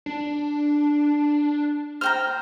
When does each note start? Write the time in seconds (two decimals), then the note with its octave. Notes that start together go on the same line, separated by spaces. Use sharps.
0.06 D4
2.01 C5 G5 A#5 F6